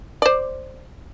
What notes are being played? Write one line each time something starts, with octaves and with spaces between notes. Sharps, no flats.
C5 D5